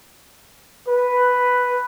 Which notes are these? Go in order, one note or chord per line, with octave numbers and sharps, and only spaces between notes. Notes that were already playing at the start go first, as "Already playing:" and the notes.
B4